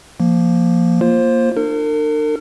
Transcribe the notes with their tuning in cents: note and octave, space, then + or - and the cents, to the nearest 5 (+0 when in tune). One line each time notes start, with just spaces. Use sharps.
F3 -10 A#3 +0
A#3 +0 F4 -10 C5 +20
D4 +45 A#4 -40